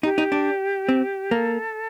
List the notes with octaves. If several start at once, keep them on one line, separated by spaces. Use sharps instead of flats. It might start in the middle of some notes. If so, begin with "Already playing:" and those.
D#4 G4
D#4
D4
C4
A#3 A4